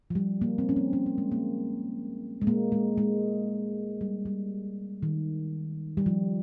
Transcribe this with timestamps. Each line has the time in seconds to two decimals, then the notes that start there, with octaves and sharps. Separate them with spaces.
0.10 F3
0.15 G3
0.41 A#3
0.58 C4
0.69 C#4
0.76 C4
0.93 C#4
1.06 C#4
1.18 G#3
1.31 A#3
2.41 G#3
2.47 A#3
2.72 G#3
2.97 G#3
4.01 G3
4.26 G3
5.03 D#3
5.97 G3
6.06 F3